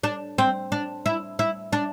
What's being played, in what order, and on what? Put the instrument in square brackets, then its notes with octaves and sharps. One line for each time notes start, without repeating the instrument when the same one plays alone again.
[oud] D4
C4
D4
E4
E4
D4